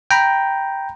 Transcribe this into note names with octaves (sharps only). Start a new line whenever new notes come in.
G5 A#5 B5